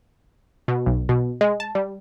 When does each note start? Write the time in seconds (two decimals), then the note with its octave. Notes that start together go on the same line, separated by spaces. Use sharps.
0.68 B2
0.86 B1
1.09 B2
1.41 G#3
1.60 A5
1.75 G3